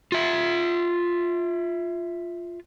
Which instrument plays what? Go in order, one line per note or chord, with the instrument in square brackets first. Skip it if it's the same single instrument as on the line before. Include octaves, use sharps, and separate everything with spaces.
[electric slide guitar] F4 E5